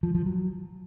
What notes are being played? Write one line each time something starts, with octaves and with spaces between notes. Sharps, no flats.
F3
F3
F#3